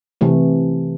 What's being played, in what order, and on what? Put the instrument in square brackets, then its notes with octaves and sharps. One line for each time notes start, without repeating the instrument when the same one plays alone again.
[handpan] C3 E3 A3